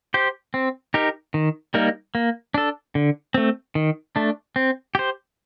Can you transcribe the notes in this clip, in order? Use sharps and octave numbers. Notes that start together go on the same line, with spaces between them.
G4 C5
C4
D#4 G4 A#4
D#3
G3 A#3 D#4 A#4
A#3
D4 A4
D3
A3 C4
D#3
A3 D4
C4
G4 C5